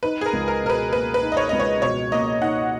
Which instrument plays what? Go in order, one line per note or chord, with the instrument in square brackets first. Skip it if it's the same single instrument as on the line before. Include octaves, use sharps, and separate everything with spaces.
[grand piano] D#4 [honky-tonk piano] B4
[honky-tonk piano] G#4
A#4
[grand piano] C#2
[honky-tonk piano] A#4
[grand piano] B2 [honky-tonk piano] A#4
[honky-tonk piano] B4
[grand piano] A#3 [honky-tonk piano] B4
[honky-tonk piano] B4
[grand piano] D#4
[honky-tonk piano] D#5
C#5
[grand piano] C#2 [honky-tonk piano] D#5
[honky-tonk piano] C#5
[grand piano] B2 [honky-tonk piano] C#5
[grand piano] A#3 [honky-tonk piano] D#5
[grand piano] D#4 [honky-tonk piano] F#5